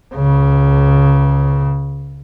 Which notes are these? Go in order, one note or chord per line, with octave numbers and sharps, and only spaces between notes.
C#2 C#3